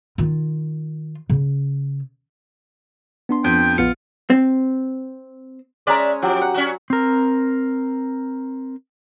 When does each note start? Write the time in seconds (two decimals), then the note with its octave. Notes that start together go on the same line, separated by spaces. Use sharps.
0.18 D#3 F4
1.30 C#3
3.29 B3 D4 C6
3.44 F2 G5
3.78 A#1 B3 F4 C#7
4.30 C4
5.87 G#3 C#4 D5 E5 A#5
6.22 F3 F#3 G4
6.41 F#5
6.54 C#4 F#4
6.90 C4 A#4